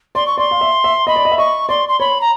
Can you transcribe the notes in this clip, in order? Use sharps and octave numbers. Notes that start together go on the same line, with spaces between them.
D5 C6
C#6
D5 C6
F5
E5
E5
D#5 B5
D5
D#5
E5
D#5 C#6
D5 C6
C6
C#5 B5
A#5